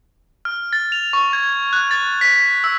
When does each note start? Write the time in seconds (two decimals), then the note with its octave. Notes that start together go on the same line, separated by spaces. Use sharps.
0.45 F6
0.73 A6
0.92 F7
1.13 C#6
1.33 G#6
1.73 F#6
1.91 A6
2.21 B6
2.64 E6